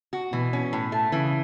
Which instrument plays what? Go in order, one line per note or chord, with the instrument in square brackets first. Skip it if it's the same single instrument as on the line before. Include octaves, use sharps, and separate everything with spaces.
[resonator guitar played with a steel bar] F#4
[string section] B2 [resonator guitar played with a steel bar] E3
[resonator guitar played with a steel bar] C#4
A2
A3
[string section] C#3 [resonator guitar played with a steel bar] E3